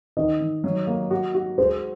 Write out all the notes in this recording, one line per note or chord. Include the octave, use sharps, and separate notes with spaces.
D#3 D#5
D#3
F#3
A#3
F#4
F#4
G#3 C5